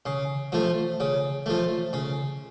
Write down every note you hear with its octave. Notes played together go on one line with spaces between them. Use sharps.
C#3
F3 A3
C#3
F3 A3
C#3